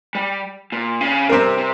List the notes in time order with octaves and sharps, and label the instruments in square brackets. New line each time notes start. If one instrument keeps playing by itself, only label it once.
[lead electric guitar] G3
A#2
C#3
[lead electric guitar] C3 [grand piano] G3 C4 G4 A#4
[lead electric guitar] C3